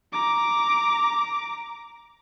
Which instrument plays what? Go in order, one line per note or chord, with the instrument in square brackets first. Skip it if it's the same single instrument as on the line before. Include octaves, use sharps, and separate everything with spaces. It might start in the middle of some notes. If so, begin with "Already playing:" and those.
[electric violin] A#5 D6